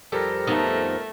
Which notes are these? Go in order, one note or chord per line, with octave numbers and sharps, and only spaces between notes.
F2 G3 G4 A4 A#4
F2 A3 B3 D#4